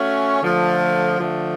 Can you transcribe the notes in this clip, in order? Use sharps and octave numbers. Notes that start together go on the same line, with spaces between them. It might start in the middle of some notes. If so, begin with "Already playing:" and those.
Already playing: A3 C#4 F#4
D3 F3 A3
D3 F3 A3